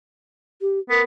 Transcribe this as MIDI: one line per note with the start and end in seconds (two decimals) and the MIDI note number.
0.61 0.79 67
0.90 1.01 59
0.90 1.03 70